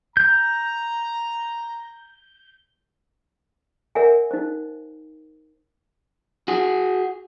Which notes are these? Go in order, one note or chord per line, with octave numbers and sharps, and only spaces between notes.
A#5 G6
A#4 C#5 E5 F#5 G#5
D#4 C5
F#4 G#4